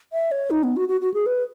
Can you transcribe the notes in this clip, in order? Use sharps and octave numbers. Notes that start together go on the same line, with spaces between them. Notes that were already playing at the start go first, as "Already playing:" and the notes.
E5
C#5
D#4
B3
F#4
F#4
F#4
G#4
B4